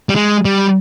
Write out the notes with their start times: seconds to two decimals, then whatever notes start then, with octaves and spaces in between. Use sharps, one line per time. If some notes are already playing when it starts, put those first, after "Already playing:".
0.09 G3
0.16 G#3
0.45 G3